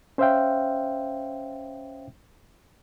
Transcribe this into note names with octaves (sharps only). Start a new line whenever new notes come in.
C#4 C5 C#5 E5 F5 G5